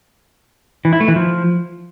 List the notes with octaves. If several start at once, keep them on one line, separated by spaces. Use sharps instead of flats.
E3
E4
A3
E3
F3